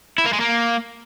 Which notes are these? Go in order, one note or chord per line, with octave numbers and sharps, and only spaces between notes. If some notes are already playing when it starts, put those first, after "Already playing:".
E4
A#3
G#3
A#3